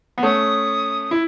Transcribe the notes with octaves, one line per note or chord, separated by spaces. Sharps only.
B3
A3 C#4 D#6
E4